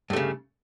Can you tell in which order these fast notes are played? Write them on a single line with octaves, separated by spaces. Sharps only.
G2 A3 C#3